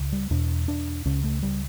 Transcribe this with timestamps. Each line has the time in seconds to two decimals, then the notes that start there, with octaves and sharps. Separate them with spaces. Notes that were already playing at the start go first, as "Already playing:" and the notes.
Already playing: C#2 C#3
0.13 G3
0.31 E2 B2 D4
0.68 D4
1.05 C#2 C#3 C#4
1.24 A3
1.43 G3